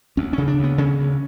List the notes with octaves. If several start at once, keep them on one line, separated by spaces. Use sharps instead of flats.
D2 C#4
C#3 C#4
D4
D2 B3
C#3 C#4
D2